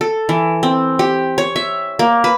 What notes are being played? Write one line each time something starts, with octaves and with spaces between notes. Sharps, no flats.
A4
E3
C4
G4
C#5
E5
A#3
B4